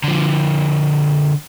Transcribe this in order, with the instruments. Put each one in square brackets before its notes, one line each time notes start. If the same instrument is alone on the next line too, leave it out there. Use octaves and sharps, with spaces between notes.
[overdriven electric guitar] D3 F3